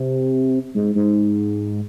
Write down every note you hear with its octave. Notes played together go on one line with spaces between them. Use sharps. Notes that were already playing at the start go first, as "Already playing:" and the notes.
Already playing: C3
G#2
G#2